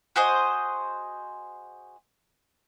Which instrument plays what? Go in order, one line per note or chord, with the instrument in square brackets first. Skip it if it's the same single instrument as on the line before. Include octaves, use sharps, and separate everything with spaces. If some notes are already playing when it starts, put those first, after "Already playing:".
[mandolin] F#4 G#4 C5 D#5